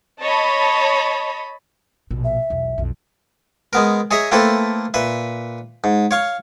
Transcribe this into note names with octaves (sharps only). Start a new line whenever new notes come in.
C#5 D#5 A5 B5
A#1 B2
E5
B1 E2
B1 F2
G#3 B3 A#4
G#4 C#5 D#5 E5 A#5
A3 A#3 C4 E4 A4 B4
A#2 B4 E5
G#2
C#5 F5 C#6